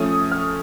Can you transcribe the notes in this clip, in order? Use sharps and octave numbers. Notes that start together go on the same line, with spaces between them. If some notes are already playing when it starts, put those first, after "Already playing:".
Already playing: F3 A3 C#4 D#6
F6